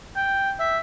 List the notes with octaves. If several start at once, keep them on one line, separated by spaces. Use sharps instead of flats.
G5
E5